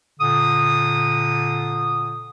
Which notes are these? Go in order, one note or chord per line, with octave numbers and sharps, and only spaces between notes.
A#2 D3 D#6